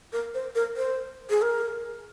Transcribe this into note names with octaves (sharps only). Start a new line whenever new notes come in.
A#4
C5
A#4
C5
G#4
A#4